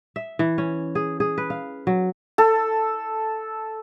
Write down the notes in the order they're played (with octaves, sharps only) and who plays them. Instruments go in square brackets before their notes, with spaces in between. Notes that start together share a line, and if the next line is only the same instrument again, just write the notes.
[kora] E5
E3
C#4
G#4
G#4
B4
F5
F#3
[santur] A4